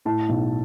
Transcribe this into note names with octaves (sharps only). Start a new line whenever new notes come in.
A2 A5
B1